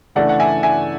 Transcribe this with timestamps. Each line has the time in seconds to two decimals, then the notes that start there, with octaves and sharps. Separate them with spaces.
0.15 C#3 E3 A3 D4 D5 F#5
0.29 F#5
0.40 E5 G#5
0.63 E5 G#5